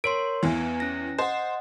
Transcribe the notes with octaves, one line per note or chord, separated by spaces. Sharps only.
A#4 C#5 C6 D7
E2 E3 B3 E4 G#5
C#4 A#6
C5 D#5 F#5